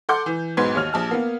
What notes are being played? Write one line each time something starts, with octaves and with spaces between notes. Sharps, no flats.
A4 F#5 C6 D6 G6
E3
B1 G#2 B3 B4 C6 G#6
D#2 C#5 F6 F7
A#1 A5 F6
A#3 B3